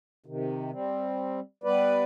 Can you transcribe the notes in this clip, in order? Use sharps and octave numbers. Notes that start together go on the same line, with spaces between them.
C3 D#3
G3 C4
G3 B3 B4 D5